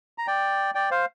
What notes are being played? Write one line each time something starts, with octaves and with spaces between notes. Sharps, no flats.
A#5
D5 G5
D5 G5
C5 F5